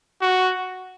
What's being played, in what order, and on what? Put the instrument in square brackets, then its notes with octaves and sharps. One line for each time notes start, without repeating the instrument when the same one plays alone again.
[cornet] F#4